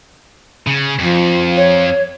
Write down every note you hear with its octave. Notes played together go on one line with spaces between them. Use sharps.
C#3
F2 F3
C#5